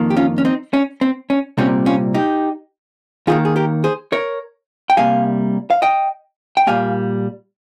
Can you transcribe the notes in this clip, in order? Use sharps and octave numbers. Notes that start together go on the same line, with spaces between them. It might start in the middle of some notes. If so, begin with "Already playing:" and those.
Already playing: F2 D#3 A#3
G4
C#4 F4
C#4
C4 D#4
C#4
C4
C#4
C2 A#2 G3 C4 C#4
C#4 F4
D#4 G4
D#2 D#3 A#3 F4 G#4
G#4
G4 A#4
G#4 C5
A#4 C#5
G5
C2 C3 G3 A#3 F5 G#5
F5
D#5 G5
G5
A#2 G3 A#3 F5 G#5